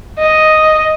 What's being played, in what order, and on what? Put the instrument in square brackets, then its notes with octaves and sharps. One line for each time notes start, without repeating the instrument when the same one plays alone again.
[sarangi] D#5